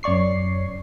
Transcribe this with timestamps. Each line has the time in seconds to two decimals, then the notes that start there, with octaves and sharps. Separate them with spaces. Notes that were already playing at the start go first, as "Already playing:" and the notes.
0.03 F#2 C#5 D5 C#6 C7